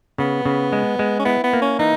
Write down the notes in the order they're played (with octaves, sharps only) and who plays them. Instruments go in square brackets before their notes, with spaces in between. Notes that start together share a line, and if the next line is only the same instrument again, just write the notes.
[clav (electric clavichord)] C#3 [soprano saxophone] B3
[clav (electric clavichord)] C#3
G#3
G#3
[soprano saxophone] C#4
[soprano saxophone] B3 [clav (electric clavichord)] E4
[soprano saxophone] B3
[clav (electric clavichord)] A#3
[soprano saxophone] C#4
[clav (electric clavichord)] E3 [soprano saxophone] D#4